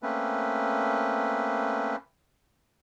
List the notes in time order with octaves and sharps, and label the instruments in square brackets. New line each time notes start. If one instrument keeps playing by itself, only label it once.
[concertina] A3 A#3 C4 C#4 B4